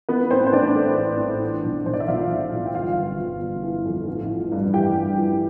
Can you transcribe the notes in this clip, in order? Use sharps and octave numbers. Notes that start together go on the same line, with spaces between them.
E3 B3 B4
A1 C4 C5
C5
A2 D4 D5
A3
A1
A1
E3
B1
B1 C5
D5
E5
B1 F4 F5
B1
B1
G5
G1 F4 F5
G1
G1
G1
E3
F2
A1
E3
G2
E3 G4 G5
G2
E3